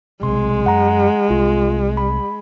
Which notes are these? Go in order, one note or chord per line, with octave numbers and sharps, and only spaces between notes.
B1 C3 G#3 C6
F#2 F#5 A#5
C2 F4
B5